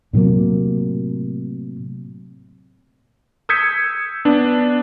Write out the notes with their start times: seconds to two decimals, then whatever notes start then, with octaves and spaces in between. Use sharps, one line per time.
0.13 A2 C3 F#3 A#3
3.49 D#6 E6 G6 G#6 B6 C#7
4.25 B3 D4